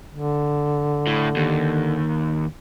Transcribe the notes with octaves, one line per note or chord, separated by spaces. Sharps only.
D3
A2
D#2